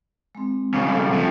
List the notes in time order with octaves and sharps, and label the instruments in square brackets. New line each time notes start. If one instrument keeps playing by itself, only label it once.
[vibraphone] G#3 C4
[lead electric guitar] G2 C#3
[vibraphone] A4 F5
[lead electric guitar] C3 F3